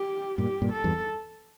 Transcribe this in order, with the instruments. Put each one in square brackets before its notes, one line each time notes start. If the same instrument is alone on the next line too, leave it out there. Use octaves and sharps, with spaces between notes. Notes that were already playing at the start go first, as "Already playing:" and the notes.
Already playing: [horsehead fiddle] G4
[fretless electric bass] G2 A#2 [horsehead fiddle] G4
[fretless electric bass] G2 A#2
[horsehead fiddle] A4
[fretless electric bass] E2 G2